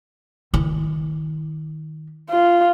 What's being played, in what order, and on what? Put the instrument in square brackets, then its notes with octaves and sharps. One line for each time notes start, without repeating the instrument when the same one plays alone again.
[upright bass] D#3 E4
[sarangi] F4